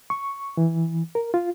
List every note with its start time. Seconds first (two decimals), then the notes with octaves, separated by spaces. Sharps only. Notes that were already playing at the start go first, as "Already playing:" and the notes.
0.10 C#6
0.57 E3
1.15 A#4
1.34 F4